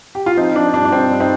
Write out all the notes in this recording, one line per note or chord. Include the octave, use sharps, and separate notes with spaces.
G4
F4
F3 C4 D#4
F3 D4
G2 D4
D4
G2 C4
G2
C4 D#4